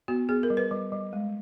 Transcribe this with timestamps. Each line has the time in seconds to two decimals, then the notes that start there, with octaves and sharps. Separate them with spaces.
0.08 B3 F#4
0.29 B3 G#4
0.43 A#4
0.50 G3
0.57 B4
0.71 G3
0.92 G3
1.13 G#3